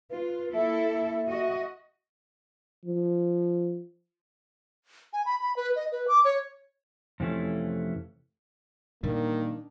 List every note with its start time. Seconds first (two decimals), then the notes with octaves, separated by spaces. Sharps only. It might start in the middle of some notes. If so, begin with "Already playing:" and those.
0.10 F4 B4
0.54 A#3 E4 A4 E5
1.27 F#4 D#5
2.85 F3
5.13 G#5
5.26 B5
5.41 B5
5.56 B4
5.76 D#5
5.92 B4
6.08 D6
6.25 C#5
7.20 F2 C3 E3 A3 C#4
9.03 A#2 D#3 E3 G3 A#3 D4